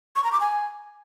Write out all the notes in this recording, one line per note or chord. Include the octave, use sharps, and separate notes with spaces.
C#6
A#5
D6
G#5